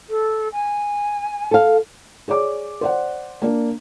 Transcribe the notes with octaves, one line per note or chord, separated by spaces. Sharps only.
A4
G#5
A4 F5
G#4 C#5 D5 D6
C5 D5 F#5
A#3 D4